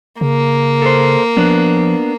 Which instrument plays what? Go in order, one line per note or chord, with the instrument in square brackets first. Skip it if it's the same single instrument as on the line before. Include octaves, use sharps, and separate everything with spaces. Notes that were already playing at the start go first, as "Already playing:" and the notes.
[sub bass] C#3 [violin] A#3
[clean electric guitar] A4 C5
[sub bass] F3 [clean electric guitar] B3 D4